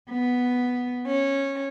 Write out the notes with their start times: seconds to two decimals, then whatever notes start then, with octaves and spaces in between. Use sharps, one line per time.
0.11 B3
1.06 C#4